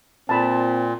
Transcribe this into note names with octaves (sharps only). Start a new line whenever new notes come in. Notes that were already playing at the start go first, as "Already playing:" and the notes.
A#2 C4 A5 B5